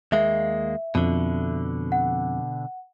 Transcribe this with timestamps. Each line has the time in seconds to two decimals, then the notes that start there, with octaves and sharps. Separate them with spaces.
0.12 D#2 G#3 A#3 E5
0.95 F2 B2 D3
1.92 F#5